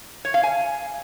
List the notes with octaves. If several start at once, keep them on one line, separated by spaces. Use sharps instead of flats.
C#5
F5
G#5